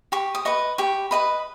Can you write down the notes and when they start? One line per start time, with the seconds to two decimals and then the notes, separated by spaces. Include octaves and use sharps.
0.12 G4 C#6
0.35 D#6
0.45 B4 D#5 C#6
0.78 G4 C#6
1.11 B4 D#5 B5